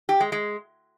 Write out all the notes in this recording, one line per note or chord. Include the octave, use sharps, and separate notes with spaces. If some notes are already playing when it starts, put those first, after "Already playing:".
G4
G#3
G#3